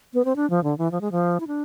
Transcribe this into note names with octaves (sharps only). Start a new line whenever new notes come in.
B3
C4
D4
F3
D3
E3
F3
G#3
F3
E4
D4